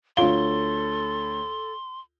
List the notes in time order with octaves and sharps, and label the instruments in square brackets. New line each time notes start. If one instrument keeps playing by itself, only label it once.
[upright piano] D2 C#5 G7 [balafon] F4 F5 [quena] A4 [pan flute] C6